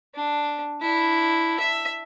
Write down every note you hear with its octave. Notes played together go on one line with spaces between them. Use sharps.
D4
D4 E4
E5